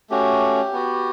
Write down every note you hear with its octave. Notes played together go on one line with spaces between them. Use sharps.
A3 C#4 F#4 G4
B3 F#4